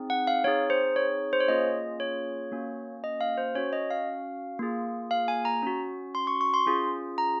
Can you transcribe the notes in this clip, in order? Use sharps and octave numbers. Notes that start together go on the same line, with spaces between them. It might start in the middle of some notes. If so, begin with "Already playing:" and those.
Already playing: C4 D#4 G#4
F#5
F5
C4 D#4 G#4 C#5
C5
C#5
C5
C#5
A#3 C#4 F4 G#4 D#5
C#5
A#3 C#4 F#4
D#5
F5
C5
C#4 F#4 C#5
D#5
F5
A#3 F4 G#4
F5
G#5
A#5
C#4 F#4
C6
C#6
C#6
C6
C#4 F4 G#4
A#5